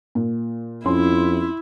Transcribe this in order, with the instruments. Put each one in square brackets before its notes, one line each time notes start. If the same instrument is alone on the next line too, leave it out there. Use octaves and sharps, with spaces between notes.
[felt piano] A#2
[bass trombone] F2 [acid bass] C#4 [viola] E4 [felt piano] C6